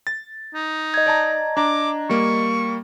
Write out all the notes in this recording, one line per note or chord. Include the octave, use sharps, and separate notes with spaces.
A6
D#4
D#5 G#6
D5 A5 A#5
D4 A#5 D6
G3 A#3 C#6